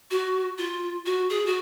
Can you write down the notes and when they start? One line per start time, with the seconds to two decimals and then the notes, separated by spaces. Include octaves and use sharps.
0.11 F#4
0.58 F4
1.06 F#4
1.30 G#4
1.46 F#4